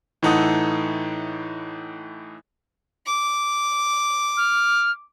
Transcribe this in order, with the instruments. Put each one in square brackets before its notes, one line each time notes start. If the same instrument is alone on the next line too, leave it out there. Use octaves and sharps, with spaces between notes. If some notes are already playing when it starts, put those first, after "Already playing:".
[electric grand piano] A2 E3 D#4 A4 F#5 D#6
[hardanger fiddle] D6
[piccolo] F6